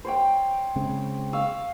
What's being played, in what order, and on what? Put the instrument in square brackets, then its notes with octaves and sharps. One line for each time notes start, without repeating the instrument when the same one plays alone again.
[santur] C5 C#5 G5
[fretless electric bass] C#3 G#3 C4
[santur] F5 C#6 E6